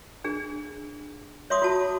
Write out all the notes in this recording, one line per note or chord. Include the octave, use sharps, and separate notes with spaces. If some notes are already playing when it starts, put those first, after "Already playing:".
D4 G#4
C#5 E5 C6 D6 D#6
F4 F#4 A5